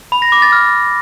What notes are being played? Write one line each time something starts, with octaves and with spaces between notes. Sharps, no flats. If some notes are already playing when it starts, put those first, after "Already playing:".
B5
A#6
D6
A6
F6